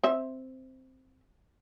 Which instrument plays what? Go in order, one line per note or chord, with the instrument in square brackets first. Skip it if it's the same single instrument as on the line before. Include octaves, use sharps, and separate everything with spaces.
[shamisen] C4 E5